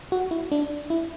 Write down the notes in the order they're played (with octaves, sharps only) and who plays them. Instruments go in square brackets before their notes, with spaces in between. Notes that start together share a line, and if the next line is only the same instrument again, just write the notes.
[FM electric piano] F#4
E4
D4
E4